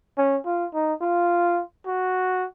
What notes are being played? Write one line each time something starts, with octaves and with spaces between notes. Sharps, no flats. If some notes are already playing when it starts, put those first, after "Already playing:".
C#4
F4
D#4
F4
F#4